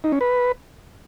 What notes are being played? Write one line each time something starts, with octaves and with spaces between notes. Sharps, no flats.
D#4
C#4
B4